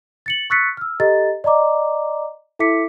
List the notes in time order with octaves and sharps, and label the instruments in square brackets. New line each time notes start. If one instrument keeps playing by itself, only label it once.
[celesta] A6 C#7 F#7
C#6 E6 F#6 A6 B6 C#7
E6 F6
G4 A4 D#5 A#5 A6
D5 D#5 A#5 D6
E4 A4 E5 D6 B6 C#7